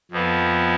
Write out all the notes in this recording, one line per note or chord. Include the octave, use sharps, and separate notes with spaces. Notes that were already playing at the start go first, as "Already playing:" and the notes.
F2 F3 B3